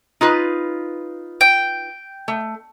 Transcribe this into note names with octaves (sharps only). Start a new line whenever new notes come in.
D#4 F4 B4
G5
A3